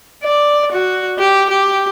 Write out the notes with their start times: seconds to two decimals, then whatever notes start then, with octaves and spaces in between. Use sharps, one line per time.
0.24 D5
0.72 F#4
1.19 G4
1.50 G4